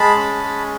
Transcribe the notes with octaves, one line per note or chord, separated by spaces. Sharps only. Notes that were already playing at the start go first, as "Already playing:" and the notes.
Already playing: G#3 A5 B5
C#4
G#3